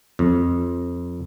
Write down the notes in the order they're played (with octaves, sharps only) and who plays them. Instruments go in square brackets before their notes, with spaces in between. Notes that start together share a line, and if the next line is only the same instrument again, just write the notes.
[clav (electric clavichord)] F2